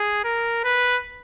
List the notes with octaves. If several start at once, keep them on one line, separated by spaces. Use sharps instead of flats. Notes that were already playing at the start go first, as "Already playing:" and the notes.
Already playing: G#4
A#4
B4